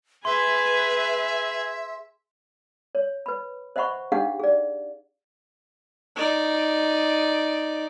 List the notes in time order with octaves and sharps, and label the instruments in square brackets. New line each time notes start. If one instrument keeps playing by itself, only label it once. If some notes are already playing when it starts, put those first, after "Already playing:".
[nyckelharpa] G#4 G#5 [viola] B4 [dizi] E5 [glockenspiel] C6
[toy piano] C#5
B4 B5
C5 D#5 E5 F#5 B5 C#6
D4 D#4 G4 G#4 F5 F#5
G#4 D5
[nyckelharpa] D#4 D5